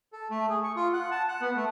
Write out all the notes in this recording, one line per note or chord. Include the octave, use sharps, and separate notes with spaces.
A4
A3
G#4
C#6
F4
F#5
A5
F#5
B3
A3